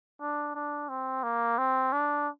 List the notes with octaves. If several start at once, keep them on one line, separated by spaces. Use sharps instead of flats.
D4
D4
C4
A#3
C4
D4